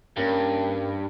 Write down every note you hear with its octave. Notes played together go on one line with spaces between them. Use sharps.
G2 A#3 C#4 A#4